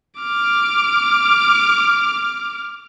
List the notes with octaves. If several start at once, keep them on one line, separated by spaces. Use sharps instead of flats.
D6 F6